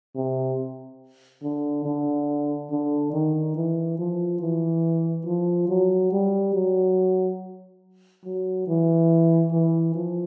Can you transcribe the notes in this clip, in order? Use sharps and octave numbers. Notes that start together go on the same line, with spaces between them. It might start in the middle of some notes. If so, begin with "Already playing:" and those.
C3
D3
D3
D3
D#3
E3
F3
E3
F3
F#3
G3
F#3
F#3
E3
E3
F3